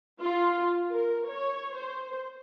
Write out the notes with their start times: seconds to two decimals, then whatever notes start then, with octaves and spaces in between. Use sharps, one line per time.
0.22 F4
0.91 A#4
1.26 C#5
1.75 C5